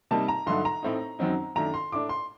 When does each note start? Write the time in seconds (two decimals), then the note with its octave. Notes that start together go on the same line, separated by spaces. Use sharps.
0.11 C3 G3 A#3 D#4 A5
0.28 A#5
0.46 G2 D3 F#3 A3 D#4 C6
0.65 A#5
0.83 A2 A3 C4 D#4
1.19 F#2 D#3 F#3 C4 D#4
1.55 F#2 D#3 A3 D4 A#5
1.74 C6
1.92 A2 A3 D4 D6
2.09 C6